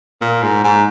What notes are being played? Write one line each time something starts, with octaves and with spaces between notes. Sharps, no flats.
A#2
G#2
G#2